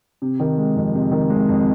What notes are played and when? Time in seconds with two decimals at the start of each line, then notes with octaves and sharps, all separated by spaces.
0.22 C3
0.40 D#3
0.58 G#3
0.76 F2
0.94 C3
1.11 D#3
1.30 G#3
1.48 F2